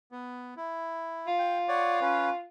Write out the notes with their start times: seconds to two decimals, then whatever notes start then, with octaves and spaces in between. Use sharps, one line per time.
0.12 B3
0.57 E4
1.27 F4
1.39 G5
1.68 C#5 D5 F#5
2.01 C#4 B4